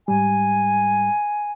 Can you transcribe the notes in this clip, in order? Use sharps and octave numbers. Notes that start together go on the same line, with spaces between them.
G#2 G3 G#5